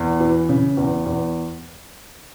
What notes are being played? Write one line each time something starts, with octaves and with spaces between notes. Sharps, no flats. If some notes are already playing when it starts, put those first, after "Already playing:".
Already playing: E2
E3
C#3
E2
E2